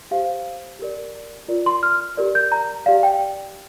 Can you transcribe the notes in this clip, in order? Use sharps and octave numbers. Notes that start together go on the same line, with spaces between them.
G4 C5 F5
G4 A#4 D5
F4 A#4 D5
C6
F6
G4 A#4 D5
G6
A#5
G4 D5 F5
G5